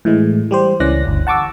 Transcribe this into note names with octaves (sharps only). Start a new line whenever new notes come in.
A2 E3 G#3
G3 G4 C5
C#2 E3 C#4 D5 F#6 A#6
G1 D2
F#5 A5 C#6 D6 E6